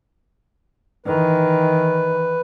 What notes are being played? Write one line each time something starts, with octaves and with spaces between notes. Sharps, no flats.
D#3 E3 B4